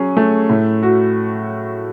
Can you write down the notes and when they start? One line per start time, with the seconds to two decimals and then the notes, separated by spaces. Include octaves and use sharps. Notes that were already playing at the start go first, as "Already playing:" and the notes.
Already playing: F#3 C#4 G#4
0.17 A3
0.50 A2
0.83 F#4